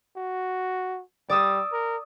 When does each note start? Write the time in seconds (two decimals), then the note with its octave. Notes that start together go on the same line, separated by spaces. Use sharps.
0.16 F#4
1.29 G3 D5 D#6 E6
1.72 A#4